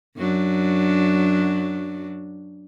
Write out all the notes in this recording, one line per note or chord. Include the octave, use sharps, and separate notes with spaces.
F#2 F#3 D4